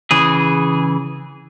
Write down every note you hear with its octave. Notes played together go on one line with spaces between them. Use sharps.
C#3 E3 G#4